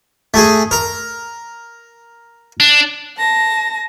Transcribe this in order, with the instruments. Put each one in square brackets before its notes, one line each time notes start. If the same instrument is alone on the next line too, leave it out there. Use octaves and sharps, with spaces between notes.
[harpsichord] A3 G#4
A#4
[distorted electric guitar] D4
[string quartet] A5 A#6